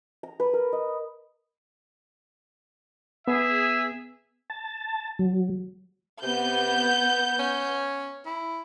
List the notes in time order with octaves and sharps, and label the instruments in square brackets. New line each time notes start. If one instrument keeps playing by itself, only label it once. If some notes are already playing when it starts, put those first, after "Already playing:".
[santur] A#5
B4
A#4
D#5
[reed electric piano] B3 [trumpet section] G#4 E5
[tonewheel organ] A5
F#3
[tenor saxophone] C3 [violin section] B3 G6
[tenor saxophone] C#4
E4